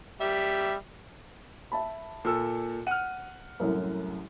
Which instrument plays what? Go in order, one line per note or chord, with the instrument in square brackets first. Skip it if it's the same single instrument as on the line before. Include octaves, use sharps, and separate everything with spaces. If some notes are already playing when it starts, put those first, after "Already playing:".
[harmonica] G3 E5
[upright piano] E5 A5 B5
[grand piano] A#2 A4 E6
[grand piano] F#5 F6 [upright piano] D#7
[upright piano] C2 F#2 A2